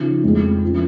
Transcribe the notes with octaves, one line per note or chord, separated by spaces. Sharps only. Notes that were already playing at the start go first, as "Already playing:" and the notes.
Already playing: C#3 F3 D#4
F2 F3 G#3
F3 C#4